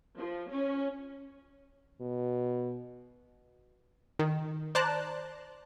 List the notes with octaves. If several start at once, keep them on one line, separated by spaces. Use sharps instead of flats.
F3
C#4
B2
D#3
C5 D5 A5 A#5 F#6